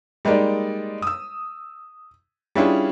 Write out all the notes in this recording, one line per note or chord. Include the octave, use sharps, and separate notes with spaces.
G3 G#3 A#3 D#4 D5
D#6 E6
G3 C#4 D4 E4 F4 G#4